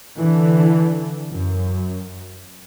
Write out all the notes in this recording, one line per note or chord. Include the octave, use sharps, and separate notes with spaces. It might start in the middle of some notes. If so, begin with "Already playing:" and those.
D3 E3
F#2